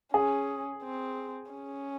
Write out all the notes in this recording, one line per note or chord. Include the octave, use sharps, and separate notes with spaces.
C#4 G#4
C4
C#4